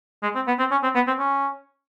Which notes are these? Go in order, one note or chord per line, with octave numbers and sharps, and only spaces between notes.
G#3
C4
B3
C4
C#4
C4
B3
C4
C#4